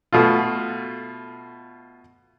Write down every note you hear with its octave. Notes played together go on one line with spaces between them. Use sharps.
B2 A3 F4